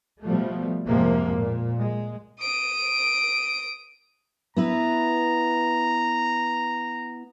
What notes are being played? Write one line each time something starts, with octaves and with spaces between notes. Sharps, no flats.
B2 F3 G3 A3
F2 G#2 C3 F3 G#3 A#3
A#2
G#3
D#6 D7
B3 E4 B4 A#5